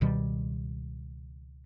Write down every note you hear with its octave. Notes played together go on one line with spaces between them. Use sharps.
C#2 B2 D#3 G3